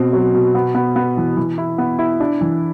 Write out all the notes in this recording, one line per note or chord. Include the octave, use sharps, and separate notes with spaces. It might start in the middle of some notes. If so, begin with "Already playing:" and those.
Already playing: B2 C4
F#3
B2
B3
B3
B3
E3
E3
E4
B3
E4
D4
E3